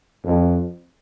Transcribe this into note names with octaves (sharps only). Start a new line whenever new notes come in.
F2